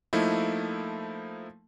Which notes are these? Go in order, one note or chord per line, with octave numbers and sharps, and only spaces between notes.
F3 A3 A#3 D#4 E4